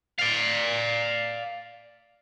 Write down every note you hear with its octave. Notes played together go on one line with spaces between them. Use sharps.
D5 F5